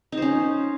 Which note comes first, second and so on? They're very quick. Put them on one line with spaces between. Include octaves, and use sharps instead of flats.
D#4 C5 C#4